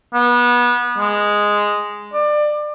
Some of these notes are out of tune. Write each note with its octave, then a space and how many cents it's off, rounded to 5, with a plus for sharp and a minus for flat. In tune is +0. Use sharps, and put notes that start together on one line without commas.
B3 -25
G#3 -5
D5 +25